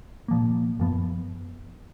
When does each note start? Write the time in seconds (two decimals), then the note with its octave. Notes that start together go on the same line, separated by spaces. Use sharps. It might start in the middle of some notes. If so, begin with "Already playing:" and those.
0.28 A#2 F3 A#3
0.79 F#2 F3 B3